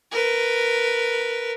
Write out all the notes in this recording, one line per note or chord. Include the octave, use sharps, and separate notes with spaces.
A#4 B4